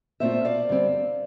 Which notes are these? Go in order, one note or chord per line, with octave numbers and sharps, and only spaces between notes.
A#2 A3 C4 F4 C5 E5
D5 F5
G2 D3 G3 C4